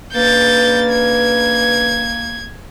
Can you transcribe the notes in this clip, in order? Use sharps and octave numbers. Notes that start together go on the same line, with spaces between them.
C#3 A#3 D4 B4 G6 A6
G#6